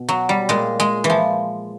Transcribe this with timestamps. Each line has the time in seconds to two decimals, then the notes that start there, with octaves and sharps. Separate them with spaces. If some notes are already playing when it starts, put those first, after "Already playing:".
Already playing: B2
0.09 F#3
0.29 G3
0.49 A#2 G#3
0.80 G#3
1.04 E3
1.10 F3